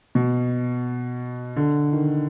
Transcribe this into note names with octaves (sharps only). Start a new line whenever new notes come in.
B2
D3
D#3